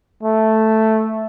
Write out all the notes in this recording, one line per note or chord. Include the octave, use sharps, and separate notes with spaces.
A3